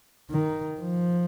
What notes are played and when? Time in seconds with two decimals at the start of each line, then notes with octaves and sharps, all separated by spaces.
0.31 D#3
0.80 F3